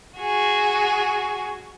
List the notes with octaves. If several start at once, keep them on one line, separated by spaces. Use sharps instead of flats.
F#4 G#4